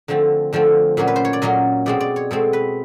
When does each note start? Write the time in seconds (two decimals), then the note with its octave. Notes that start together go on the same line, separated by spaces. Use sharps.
0.08 D3 F3 A3 C4
0.53 D3 F3 A3 C4
0.97 A#2 F#3 A#3 C#4
1.08 B4
1.16 C5
1.25 C#5
1.33 D5
1.42 A#2 F#3 A#3 C#4 D#5
1.86 B2 G#3 C4 D5
2.00 D5
2.16 C#5
2.31 B2 G#3 C4 A4
2.53 B4